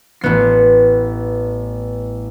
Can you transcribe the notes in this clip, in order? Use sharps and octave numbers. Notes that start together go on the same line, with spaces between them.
A1 B3 C7